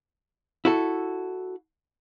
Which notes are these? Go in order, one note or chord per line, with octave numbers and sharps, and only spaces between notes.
E4 F#4 A4